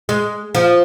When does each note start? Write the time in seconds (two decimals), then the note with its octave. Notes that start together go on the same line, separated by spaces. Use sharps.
0.09 G#3
0.55 F3